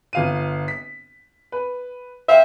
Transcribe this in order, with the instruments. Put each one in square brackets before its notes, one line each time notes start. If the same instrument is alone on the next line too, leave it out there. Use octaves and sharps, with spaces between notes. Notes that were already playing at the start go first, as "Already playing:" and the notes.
[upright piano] G1 F5 D#7
B6
B4
[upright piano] C5 F5 G5 [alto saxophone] E5